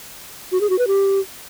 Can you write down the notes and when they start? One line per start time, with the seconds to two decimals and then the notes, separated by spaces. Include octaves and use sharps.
0.52 F#4
0.61 G#4
0.70 F#4
0.79 B4
0.88 G4